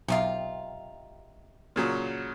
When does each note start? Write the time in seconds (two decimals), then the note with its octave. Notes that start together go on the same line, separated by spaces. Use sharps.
0.08 B1 C3 D#3 F4
1.76 A#2 C#3 F#3